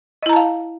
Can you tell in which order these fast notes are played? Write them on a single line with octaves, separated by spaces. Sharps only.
D#5 E4 A#5 A5 F5